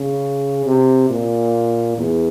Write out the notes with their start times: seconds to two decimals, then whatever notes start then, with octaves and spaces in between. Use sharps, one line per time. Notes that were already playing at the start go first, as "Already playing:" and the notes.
Already playing: C#3
0.66 C3
1.10 A#2
1.98 E2